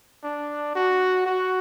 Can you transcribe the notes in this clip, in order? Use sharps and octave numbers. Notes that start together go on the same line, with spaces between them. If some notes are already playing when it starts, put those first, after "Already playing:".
D4
F#4
F#4